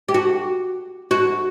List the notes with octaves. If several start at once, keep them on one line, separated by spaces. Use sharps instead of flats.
G4
F#4
F#4